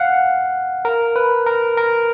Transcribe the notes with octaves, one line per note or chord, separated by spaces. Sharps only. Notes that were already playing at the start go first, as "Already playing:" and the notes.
Already playing: F5 F#5
A#4
B4
A#4
A#4